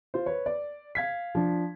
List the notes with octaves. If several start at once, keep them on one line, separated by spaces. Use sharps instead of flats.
F4 C5
B4 C#5
D5
F5 G#6 B6
F3 D4